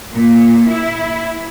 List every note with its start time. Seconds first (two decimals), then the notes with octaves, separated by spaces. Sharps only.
0.13 A#2
0.67 E4